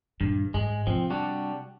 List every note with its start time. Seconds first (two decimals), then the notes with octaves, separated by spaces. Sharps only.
0.21 G2 A#2 D#3
0.54 G#2 G#3
0.87 C3 F3 C4
1.10 G3 D4 F#4